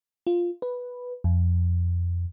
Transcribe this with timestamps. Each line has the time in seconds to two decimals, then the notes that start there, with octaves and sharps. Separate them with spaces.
0.27 F4
0.62 B4
1.24 F2